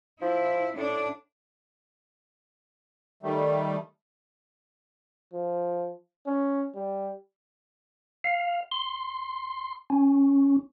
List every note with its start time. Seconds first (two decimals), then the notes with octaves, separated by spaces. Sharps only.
0.21 F3 E4
0.77 A2 D4
3.23 D#3 G3 A3
5.34 F3
6.27 C#4
6.75 G3
8.24 F5
8.72 C6
9.90 C#4